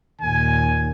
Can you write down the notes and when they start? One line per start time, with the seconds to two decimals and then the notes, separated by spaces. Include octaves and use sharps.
0.21 D#2 A#2 G#5